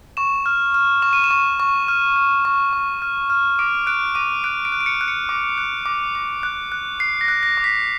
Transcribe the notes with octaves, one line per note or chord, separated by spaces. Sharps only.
C#6 E7
F6
F6
C#6 E7
D#7
E7
C#6
C#6
F6
F6
C#6
C#6
F6
F6
D6 D7
F#6 D7
D6 D#7
F#6 D7
D7
F#6
D7
C#7
F#6
C#7
D6
F#6
D6
D6
F#6
F#6
F#6 C7
A#6
F#6
A#6
D6
B6